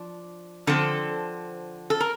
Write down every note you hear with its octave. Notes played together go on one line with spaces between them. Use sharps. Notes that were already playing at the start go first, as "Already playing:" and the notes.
Already playing: F3 D4
D3 F3 C4 A4
A4
A#4